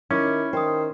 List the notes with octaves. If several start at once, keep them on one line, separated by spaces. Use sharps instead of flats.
D#3 C#4 E4 D6
D#3 C5 G5 D#6